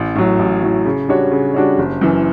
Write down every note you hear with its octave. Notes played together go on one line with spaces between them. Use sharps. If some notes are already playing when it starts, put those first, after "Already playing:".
Already playing: A1
A2 F#3
A1
A2 F#3
C#3
G3 D4 F#4 C#5
C#3
G3 D4 F#4 C#5
F#1
F#2 E3